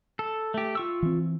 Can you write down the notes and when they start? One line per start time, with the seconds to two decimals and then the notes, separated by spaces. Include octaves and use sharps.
0.19 A4
0.54 A3 G4
0.75 F4 C#6 E6
1.03 E3 C4